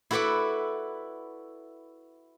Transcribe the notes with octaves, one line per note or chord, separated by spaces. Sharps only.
E4 F#4 A4 B4 D5 F#5